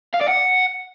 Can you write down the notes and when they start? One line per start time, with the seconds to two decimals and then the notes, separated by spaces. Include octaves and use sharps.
0.14 F5
0.21 D5
0.29 F#5